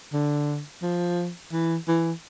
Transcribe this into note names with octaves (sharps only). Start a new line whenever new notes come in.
D3
F3
E3
E3